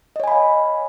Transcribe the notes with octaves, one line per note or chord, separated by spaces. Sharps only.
C#5 D#5 F5 G#5 B5